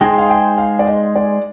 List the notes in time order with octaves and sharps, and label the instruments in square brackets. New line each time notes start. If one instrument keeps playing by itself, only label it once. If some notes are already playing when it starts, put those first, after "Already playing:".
[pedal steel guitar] G#3 D#4 G#4 C5 [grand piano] G5
[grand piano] F5
G5
F5
D5
D#5
D5